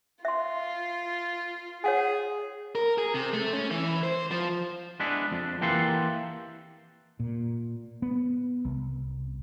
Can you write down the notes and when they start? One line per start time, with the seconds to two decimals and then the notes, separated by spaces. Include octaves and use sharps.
0.25 F4 E5 C6
1.84 G#4 C#5 F#5 G#5
2.75 A#4
2.98 G#4
3.14 C3
3.33 A3
3.53 C#4
3.71 E3
4.04 C5
4.31 F3
5.00 G#3 B3 D4 E4
5.32 F2 D4
5.61 E3 A#3 G4 A4 F#5 C6
7.20 A#2
8.02 B3
8.65 C2